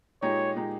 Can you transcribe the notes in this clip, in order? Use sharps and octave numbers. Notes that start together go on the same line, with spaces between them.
A#2 G#3 D#4 G4 C#5
A#2 G#3 D#4 G4